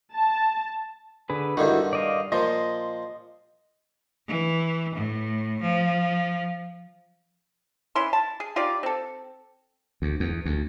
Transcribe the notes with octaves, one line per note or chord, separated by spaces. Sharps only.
A5
D3 G#4 B4
G2 D3 D#3 E4 F#4
D5 D#5 F5
A#2 F3 D#5 C6
E3
A2
F3
E3 C#4 E4 C6
A5
G#4
D#4 F4 G4 D5
C4 A4
D2
E2
D2